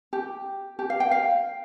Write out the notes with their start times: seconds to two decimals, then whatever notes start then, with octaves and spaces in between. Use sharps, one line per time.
0.13 G4
0.79 G4
0.90 F5
1.00 G5
1.11 F5